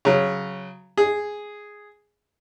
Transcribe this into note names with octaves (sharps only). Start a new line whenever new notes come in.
C#3 F#3
G#4